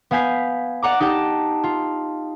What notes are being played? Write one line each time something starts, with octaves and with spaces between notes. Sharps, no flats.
B3 F5 G#5 G6 B6 C7
D5 F#5 A#5 D6
D#4 G4 F#5 G5 A5
F4